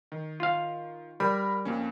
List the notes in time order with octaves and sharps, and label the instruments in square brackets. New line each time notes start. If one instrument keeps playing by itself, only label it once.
[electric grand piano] D#3
[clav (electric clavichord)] F4 F5
[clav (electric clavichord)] G3 [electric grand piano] A#4 B5
[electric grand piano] F2 A#3 C#4